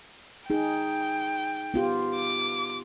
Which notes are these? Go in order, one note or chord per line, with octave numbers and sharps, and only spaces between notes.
D#4 G#4 G5
B3 F4 G4
D6